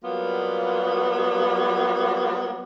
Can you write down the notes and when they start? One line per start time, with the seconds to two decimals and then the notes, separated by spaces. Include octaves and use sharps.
0.04 F#3 G3 A#3 B3 F4